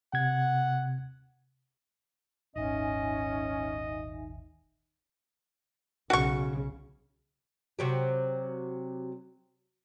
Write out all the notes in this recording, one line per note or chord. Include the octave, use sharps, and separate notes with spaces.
C3 F#5 G#6
D#1 G#1 G#2 C#4 D#4 D#5 E5 G#5
B1 C#3 F#4 C#6
C3 F#3 G4